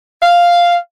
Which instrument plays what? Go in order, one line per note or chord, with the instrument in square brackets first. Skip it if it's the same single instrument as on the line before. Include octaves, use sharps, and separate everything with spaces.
[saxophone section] F5